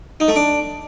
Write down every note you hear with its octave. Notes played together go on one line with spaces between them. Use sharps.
D#4
A3
D4